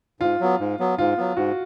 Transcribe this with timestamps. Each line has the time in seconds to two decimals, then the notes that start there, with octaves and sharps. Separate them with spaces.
0.20 G#2 F4
0.40 F#3 B3
0.60 G#2
0.79 F#3 B3
0.98 G#2 F4
1.17 F#3 B3
1.36 G#2 F#4